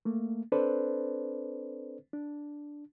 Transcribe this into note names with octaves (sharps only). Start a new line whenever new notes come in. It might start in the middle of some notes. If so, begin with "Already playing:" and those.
A3 A#3
C4 D4 A4 B4 C5 D5
D4